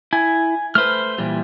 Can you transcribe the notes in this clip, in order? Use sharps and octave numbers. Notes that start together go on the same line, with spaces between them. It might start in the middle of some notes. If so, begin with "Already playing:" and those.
E4 G#5
A3 B4 C5 F6
A#2 E3 G3